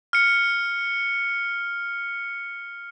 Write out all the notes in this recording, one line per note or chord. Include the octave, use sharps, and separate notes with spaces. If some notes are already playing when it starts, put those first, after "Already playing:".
F6 C#7